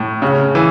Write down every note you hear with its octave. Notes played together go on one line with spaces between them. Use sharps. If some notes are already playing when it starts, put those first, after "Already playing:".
Already playing: A2
C#3
E3